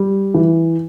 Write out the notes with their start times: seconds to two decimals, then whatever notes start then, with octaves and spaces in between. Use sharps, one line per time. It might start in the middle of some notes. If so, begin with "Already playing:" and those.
Already playing: G3
0.34 E3